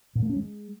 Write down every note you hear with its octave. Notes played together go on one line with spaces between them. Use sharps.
A#2
A3
C#4
G#3